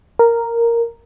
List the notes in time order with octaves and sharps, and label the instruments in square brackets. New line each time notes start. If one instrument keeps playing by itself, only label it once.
[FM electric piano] A#4